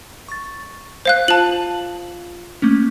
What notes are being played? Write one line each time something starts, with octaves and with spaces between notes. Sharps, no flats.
C#6 A6
C5 F5 F#6
F4 A5 F#7
A3 A#3 C#4